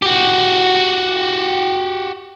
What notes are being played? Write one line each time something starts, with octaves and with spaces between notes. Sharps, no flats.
F#4 G4